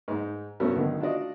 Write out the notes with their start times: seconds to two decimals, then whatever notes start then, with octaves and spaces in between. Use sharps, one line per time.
0.08 G#2 D#4
0.60 C2 G2 A3 B3 C#4 F#4
0.76 B1 D3 D#3
1.01 D4 F4 F#4 D5 D#5